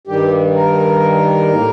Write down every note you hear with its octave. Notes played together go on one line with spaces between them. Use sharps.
G2 D#3 G3 G4
A#4
A2 G3 A#3